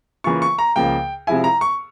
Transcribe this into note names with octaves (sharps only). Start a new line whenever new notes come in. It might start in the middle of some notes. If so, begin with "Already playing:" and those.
C#3 E3 A#3 F4 C#6
C#6
A#5
C#2 C#3 F3 A#3 G5
C3 F3 G#3 E4 G#5
A#5
C#6